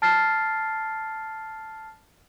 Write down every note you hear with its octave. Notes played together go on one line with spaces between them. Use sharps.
A5 F6 A6 C7